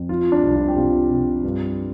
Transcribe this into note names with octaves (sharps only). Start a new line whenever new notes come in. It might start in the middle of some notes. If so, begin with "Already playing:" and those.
Already playing: F2
F3 F4
D4
C2
F4
G4
C3 F4
C3
G2